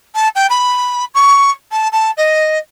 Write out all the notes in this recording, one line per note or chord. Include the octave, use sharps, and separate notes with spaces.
A5
G5
B5
C#6
A5
A5
D#5